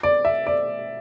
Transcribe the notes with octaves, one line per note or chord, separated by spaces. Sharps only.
D5
E5
D5